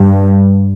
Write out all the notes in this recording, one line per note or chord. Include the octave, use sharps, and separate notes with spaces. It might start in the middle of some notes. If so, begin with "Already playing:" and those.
Already playing: G2